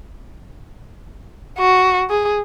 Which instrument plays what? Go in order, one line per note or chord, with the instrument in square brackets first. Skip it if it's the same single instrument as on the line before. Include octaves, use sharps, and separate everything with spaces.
[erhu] F#4
G#4